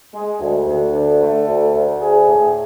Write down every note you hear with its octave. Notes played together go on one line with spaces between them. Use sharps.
G#3
D2
D2
D3
A3
D2
D2
G#4
A2